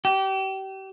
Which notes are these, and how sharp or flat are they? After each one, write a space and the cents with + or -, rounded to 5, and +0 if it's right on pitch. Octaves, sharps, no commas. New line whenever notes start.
G4 -30